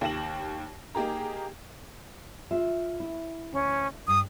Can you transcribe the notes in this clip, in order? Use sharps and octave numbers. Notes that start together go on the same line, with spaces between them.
D#2 G4 G5 A#6 E7 F#7
A#3 D#4 G4 G#4 A#5
F4 E5
E4
D2 C#4
G2 D#6